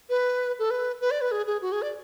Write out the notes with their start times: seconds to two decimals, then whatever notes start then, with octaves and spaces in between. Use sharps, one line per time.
0.09 B4
0.59 A4
0.70 B4
1.01 B4
1.11 D5
1.21 B4
1.31 G#4
1.47 G#4
1.62 F#4
1.72 G#4
1.82 D5